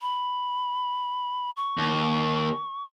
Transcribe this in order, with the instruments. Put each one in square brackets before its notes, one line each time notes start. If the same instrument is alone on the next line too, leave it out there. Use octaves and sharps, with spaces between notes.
[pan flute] B5
C#6
[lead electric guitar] D#2